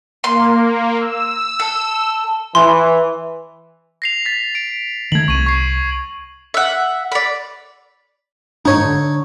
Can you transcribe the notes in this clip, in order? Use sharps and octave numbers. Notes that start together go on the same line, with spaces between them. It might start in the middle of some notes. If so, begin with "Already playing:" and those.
A#3 C6
E6
A4
E3 C6
A#6 C7 F7
A6 B6
D7
D#3 A3 G#6 F#7
C2 C#6 D#7
C#6 C7
E5 F#5
D5 B5
G1 G#2 D4 D#4 C#5
D3